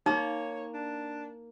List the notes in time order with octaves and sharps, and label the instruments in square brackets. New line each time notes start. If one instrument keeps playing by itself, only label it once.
[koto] A#3 [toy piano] D#4 [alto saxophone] C#5
[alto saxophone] D4